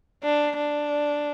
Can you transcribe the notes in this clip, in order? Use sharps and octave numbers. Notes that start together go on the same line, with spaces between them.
D4
D4